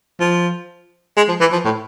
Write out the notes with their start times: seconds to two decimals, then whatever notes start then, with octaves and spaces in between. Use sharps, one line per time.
0.20 F3
1.17 G#3
1.28 F3
1.40 E3
1.52 F3
1.65 A2